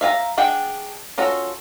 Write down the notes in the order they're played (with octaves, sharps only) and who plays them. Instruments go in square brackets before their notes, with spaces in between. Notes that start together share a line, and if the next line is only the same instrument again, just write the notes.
[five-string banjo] E5 F5 G#5 A#5
D4 G#4 F#5 G5
C#4 F4 F#4 A4